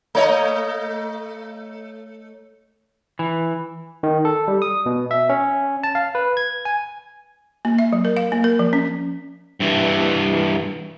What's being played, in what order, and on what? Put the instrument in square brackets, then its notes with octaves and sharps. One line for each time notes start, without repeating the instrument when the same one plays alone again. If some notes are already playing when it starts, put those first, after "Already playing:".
[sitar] A3 C#5 D#5
[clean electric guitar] E3
[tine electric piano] D#3
A4
G3
D#6
B2
E5
C#4
A5
F5
B4
G#6
G#5
[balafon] A#3
E5
F#3
A#4
F5
A#3
A#4
F3
C#4
[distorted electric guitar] G2 E3